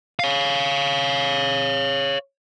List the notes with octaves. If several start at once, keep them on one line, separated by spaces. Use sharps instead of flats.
C#5 F5